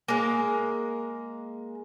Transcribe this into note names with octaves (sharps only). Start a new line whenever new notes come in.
G#3 A#3